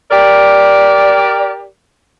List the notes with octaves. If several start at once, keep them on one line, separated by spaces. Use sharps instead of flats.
G4 A#4 D5